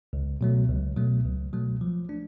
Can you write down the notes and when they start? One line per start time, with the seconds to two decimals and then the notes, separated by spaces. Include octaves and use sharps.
0.13 C#2
0.41 B2 F#3 A3
0.69 C#2
0.97 B2 F#3 A3
1.25 C#2
1.53 B2 F#3 A3
1.81 F3
2.09 A3 D4